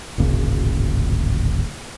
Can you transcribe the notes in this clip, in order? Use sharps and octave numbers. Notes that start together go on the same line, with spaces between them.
D1 G#1 A#2 C#3